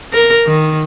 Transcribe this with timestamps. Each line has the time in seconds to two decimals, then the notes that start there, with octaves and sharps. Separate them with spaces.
0.13 A#4
0.46 D#3